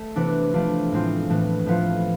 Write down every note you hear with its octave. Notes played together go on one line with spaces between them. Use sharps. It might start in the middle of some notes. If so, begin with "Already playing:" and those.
Already playing: A3
C3 E3 B3 D4
F3 A3 D4 F4
A2 G#3 C4 F4
A2 E3 A3
A2 F3 B3 F4